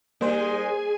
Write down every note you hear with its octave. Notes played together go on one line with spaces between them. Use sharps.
G3 G#3 A#3 D#4 G#4 C5 G#5